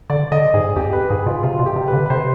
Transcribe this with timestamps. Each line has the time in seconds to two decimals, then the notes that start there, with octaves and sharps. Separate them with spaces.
0.10 D3 D5
0.32 D3 D#5
0.54 G#2 G#4
0.76 F2 G4
0.93 B4
1.10 G#2 G#4
1.26 B2 F4
1.43 C3 F4
1.59 B2
1.66 G4
1.76 C3
1.88 B4
1.93 D3
2.06 B4
2.10 C3 C5